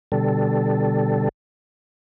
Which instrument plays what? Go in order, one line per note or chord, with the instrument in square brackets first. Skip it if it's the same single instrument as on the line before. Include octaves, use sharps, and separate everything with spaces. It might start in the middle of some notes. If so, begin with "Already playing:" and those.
[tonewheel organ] B2 D3 G3 A4